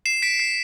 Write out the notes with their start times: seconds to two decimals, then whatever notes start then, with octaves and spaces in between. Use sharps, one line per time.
0.06 C7 E7
0.22 B6 D7
0.40 C7